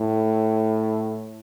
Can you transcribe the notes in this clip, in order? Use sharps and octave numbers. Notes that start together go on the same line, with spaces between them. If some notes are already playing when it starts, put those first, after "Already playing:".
Already playing: A2